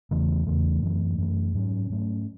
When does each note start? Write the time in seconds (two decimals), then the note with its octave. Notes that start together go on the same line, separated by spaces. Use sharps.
0.11 E2 C#3 E3 A3
0.46 E2 C#3 E3 A3
0.82 F#2 E3 A3
1.18 F#2 E3 A3
1.54 G#2 F#3 A3 C#4
1.90 G#2 F#3 A3 C#4